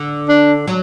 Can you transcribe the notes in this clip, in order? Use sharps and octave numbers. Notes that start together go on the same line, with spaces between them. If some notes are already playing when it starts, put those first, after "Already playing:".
Already playing: D3
D4
F#3